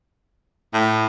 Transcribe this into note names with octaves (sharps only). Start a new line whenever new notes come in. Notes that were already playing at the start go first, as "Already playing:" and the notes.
A2